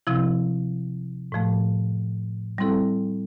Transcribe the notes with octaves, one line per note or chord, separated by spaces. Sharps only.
C3 F3 C4 E4
A2 F3 A3
G3 C4 E4 A4